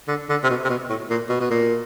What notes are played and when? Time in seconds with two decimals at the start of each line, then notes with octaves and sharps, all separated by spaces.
0.08 D3
0.29 D3
0.43 C3
0.50 B2
0.64 C3
0.69 B2
0.89 A2
1.10 A#2
1.29 B2
1.40 B2
1.50 A#2